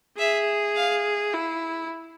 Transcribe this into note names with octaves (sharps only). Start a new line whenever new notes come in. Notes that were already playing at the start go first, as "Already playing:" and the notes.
G#4 E5
F5
E4